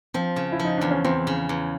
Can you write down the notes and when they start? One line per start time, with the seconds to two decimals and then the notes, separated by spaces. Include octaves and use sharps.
0.14 F3 C4
0.36 C#3
0.52 E4
0.60 F3
0.65 D#4
0.78 E2 D4
0.91 C#4
1.04 E2 C4
1.27 C#3
1.49 E2